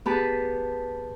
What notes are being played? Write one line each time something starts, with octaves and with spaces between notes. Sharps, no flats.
B3 G4 G#4 B4 A5